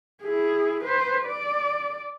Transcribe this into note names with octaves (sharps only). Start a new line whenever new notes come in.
E4 G#4
B4 C5
D5